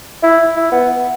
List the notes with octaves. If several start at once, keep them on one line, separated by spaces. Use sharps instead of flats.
E4
E4
B3